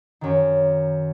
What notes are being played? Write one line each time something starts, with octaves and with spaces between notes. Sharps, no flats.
F#2 D#3